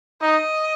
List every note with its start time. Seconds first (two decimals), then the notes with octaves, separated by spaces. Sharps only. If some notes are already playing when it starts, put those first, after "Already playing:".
0.22 D#4 D#5